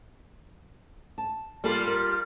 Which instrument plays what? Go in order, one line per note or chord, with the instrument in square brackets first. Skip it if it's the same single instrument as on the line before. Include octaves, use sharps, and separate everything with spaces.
[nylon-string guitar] A5
[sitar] G3 F4 [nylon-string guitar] A#3 A4
[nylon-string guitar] A#4